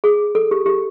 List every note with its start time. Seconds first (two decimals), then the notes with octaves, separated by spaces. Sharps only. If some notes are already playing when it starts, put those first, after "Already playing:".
0.04 G#4
0.35 A4
0.51 G4
0.66 G4